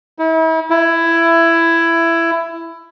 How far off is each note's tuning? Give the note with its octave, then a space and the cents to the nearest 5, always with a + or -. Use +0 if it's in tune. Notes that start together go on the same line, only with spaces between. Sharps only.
E4 -40
E4 +15